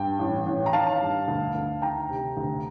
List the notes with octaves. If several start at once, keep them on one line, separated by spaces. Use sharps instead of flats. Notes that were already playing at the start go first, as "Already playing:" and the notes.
Already playing: G2 G5
A1
A1
A#5
D#3 F5 A5
G2
D2
D2
D#3 G5 A#5
C3
D2